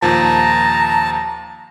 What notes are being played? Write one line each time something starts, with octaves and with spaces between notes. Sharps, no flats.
D#2 A#2 F3 A5 A#5